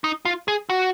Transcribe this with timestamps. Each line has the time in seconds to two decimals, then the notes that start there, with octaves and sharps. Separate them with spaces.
0.04 D#4
0.25 F4
0.48 G#4
0.70 F#4